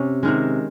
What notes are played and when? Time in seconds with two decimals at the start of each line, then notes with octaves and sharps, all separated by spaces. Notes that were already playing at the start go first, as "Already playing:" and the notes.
Already playing: C3 C#4
0.23 C3 D#3 G#3